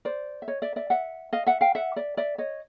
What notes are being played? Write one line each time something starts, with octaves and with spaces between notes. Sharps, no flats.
C5 D5
E5
C#5 D#5
D5 E5
D5 E5
E5 F#5
D#5 F5
E5 F#5
F5 G5
E5 F#5
D5 E5
D5 E5
C#5 D#5